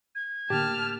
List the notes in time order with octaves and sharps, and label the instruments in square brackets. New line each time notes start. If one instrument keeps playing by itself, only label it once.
[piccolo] G#6
[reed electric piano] A2 D3 A#3 [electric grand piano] G4 [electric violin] A5 F6